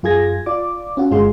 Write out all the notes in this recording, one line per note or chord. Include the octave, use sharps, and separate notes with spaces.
F#2 F4 G#4 G#6 A#6
F4 D5 D6
C#4 F4 F#4
G1 G#3 F4 G#4 C6